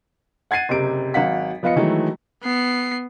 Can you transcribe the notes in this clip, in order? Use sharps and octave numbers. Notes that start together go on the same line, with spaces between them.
F#5 G#6 A6 C7 D#7
F#1 C3 G4 D7
G#1 F#3 F5 F#5 B6
F3 B3 F4 D#5 C#7
D#3 E3 F#3 G#3 A3
B3 C7